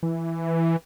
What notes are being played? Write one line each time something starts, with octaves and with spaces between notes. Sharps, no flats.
E3